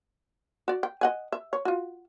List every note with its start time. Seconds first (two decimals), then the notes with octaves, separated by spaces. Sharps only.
0.68 F#4 D5
0.83 G5
1.01 D#5 F#5 G#5
1.32 E5
1.53 C#5
1.65 F4 F#4